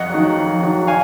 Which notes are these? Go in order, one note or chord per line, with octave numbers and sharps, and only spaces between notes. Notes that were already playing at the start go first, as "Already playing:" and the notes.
Already playing: F2 D#5 F#5
D#3 F#3
F2
D#3 F#3
F5 G#5